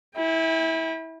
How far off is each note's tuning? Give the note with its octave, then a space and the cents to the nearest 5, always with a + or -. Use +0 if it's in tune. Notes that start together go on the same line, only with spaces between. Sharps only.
E4 -20 G5 +40